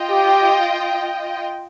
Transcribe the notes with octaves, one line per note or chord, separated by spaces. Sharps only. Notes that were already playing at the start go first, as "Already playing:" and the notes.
Already playing: F4 D#5 G5
G4